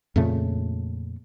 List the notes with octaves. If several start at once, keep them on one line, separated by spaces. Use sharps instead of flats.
F2 A#2 C#3 A3